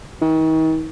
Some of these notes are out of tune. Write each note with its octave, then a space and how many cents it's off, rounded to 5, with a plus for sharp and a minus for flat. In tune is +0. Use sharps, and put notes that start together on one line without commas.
D#3 +40